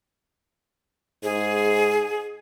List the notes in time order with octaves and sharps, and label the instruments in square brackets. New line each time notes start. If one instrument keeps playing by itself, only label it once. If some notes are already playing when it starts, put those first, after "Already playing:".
[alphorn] G#2 [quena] G#4